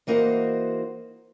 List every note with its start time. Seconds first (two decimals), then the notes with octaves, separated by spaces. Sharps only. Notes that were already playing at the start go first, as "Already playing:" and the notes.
0.07 E3 A#3 D#4 F#4 C5